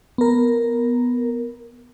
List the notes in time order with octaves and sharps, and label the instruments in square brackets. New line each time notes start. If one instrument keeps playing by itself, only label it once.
[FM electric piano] B3 A#4